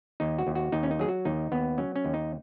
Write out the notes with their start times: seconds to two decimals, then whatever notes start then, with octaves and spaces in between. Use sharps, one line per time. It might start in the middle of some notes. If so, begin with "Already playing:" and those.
0.20 D#2 D#4
0.38 F#4
0.47 D#2
0.55 F#4
0.72 D#2 D#4
0.83 C#4
0.91 D#4
0.99 F#3 G#4
1.09 F#4
1.25 D#2 D#4
1.52 D#2 B3
1.78 F#3 C#4
1.96 C#4
2.05 D#2
2.14 D#4